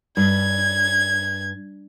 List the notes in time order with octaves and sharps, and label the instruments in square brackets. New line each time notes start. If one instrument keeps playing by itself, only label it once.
[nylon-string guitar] G2 [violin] G#6